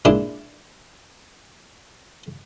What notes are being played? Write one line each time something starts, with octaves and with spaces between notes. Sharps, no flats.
A#2 G#3 D4 E4